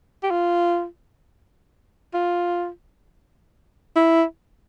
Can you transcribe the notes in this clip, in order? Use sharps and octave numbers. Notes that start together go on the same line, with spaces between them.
G4
F4
F4
E4